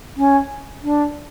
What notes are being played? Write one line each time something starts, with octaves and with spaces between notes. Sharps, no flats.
C#4
D4